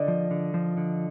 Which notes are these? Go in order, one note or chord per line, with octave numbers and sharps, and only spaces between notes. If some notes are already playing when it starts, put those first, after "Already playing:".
Already playing: D3 D5 D#5
F3
D3
F3
D3